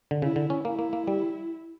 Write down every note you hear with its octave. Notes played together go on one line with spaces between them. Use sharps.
D3
C#3 E4
D3
C#4
A#3 E4
A#3
A#3
G3